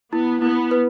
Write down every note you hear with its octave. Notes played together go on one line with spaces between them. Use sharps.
B3 E4
B3 E4
B4